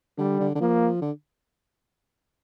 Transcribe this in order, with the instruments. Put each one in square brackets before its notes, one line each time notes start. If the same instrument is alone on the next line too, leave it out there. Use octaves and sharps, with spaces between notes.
[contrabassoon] D3 [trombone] G3
[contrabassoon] D3
D3
[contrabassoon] F3 [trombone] A#3
[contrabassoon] D3